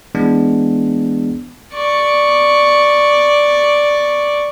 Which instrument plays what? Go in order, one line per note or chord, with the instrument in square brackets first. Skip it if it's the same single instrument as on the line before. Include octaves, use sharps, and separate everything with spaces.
[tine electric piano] E3 G#3 B3 D4
[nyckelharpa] D5 C#6